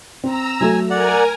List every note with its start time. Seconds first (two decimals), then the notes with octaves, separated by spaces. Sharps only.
0.24 C4 A#5 E6
0.61 F#3 A3 G#5
0.90 A#4 D5 F#5 G#5 A#5